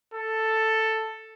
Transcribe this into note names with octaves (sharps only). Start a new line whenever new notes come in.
A4